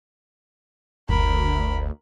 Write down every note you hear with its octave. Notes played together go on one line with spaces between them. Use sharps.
F#1 D2 A#4 B5